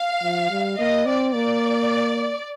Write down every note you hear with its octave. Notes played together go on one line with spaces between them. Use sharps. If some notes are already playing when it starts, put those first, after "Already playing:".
Already playing: F5
F3
G3
A#3 D#5
C4 D5
A#3 D5